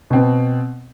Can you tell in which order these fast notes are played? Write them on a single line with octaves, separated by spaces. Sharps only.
B2 C4 B3